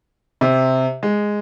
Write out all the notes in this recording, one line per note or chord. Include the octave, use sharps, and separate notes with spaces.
C3
G#3